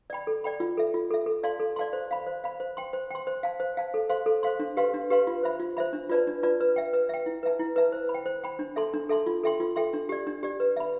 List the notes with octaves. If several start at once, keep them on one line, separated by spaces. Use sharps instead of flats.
D5 G5 B5
A4
D5 G5 B5
F4
A4 E5
F4
A4 E5
A4
D5 F5 A5 C6
A4
D5 F5 A5 C6
C5
F5 B5
C5
F5 B5
C5
G5 C6
C5
G5 C6
C5
F5 A5
C5
F5 A5
A4
C5 F5 C6
A4
C5 F5 C6
D4
G4 B4 F5 C6
D4
G4 B4 F5 C6
F4
C5 E5 B5
F4
C5 E5 B5
D4
F4 B4 D5 A5
D4
F4 B4 D5 A5
B4
E5 G5
B4
E5 G5
E4
B4 E5 A5
E4
B4 E5 A5
C5
B5
G5
C5
G5 B5
D4
A4 E5 A5 C6
D4
A4 E5 A5 C6
F4
A4 E5 G5 C6
F4
A4 E5 G5 C6
D4
G4 D5
D4
G4 D5
B4
E5 B5